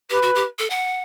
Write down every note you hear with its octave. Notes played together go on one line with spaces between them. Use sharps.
G4 B4
F#4
G4
A4
F#5